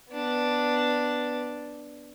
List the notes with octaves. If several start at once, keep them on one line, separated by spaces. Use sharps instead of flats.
B3 D4